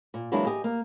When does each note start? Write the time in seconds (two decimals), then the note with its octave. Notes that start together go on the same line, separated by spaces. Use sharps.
0.14 A#2
0.32 E3 F#3 G#3 A#3 D4 E4
0.47 G4 D#5 G#5
0.64 A#3